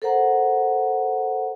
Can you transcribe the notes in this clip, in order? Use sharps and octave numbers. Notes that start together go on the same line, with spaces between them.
A4 A#4 C5 F#5 A#5